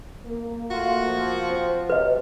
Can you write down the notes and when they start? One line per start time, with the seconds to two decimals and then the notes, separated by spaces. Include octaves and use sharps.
0.25 A#3
0.71 A3 A#3 F4 F#4
1.07 F3
1.48 C4 C5
1.90 C3 F#3 B4 D#5